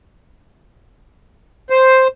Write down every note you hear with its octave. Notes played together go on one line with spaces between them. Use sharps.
C5